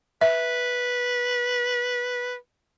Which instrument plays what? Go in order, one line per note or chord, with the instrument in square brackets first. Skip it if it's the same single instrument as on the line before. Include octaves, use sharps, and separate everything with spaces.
[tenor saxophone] B4 [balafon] E5